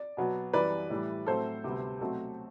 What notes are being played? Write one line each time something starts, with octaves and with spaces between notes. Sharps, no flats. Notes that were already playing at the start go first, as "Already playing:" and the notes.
Already playing: D5
B2 F#3 B3
F#2 E3 G3 B4 D5
A2 E3 G3
A2 F#3 A3 C4 A4 C5
D2 C3 G3 B3
B2 F#3 A3 C4